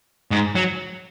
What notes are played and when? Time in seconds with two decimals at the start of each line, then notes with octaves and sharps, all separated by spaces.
0.31 G#2
0.56 F#3